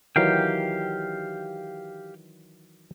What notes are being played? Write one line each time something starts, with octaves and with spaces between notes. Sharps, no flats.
D#3 E3 F#3 G4 F5 G5